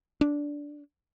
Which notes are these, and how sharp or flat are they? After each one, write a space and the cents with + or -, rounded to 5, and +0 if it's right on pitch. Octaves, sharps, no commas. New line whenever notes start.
D4 -10